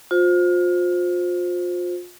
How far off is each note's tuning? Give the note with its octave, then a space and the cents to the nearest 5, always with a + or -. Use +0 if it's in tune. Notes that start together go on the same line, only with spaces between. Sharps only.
F4 +30 C5 +0